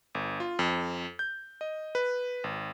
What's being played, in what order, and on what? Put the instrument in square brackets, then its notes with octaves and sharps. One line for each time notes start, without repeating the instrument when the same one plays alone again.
[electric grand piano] G1
F4
F2
G6
D#5
B4
G#1